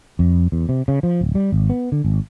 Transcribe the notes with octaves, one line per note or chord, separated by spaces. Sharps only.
F2
E2
C3
C#3
F3
D1
G3
G#1
B3
D3
G#1